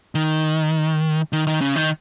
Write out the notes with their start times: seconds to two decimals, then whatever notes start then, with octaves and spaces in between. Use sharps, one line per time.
0.15 D#3
1.33 D#3
1.47 D#3
1.61 C#3
1.76 D#3